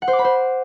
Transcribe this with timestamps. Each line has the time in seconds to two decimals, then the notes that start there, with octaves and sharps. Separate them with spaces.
0.02 F#5
0.08 C5
0.13 D6
0.19 B5
0.24 C5